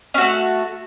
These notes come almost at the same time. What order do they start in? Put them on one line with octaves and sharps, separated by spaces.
C#4 F#4 A3